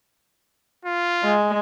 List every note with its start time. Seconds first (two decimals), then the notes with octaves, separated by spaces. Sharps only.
0.85 F4
1.23 G#3